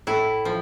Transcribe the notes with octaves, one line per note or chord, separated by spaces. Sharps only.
A2 E4
F3